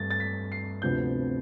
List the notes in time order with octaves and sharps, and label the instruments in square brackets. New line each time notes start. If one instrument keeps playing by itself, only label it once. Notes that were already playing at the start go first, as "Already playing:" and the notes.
Already playing: [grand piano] G2 A3 A6
A6
B6
C7
D2 C3 F3 B3 D4 G6